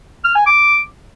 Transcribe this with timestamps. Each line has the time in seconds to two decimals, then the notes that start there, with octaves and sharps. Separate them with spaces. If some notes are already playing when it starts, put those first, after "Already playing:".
0.25 F6
0.35 G#5
0.46 D6